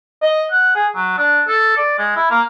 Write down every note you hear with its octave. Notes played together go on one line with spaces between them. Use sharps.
D#5
F#5
G#4
F#3
D4
A4
D5
G#3
E4
A#3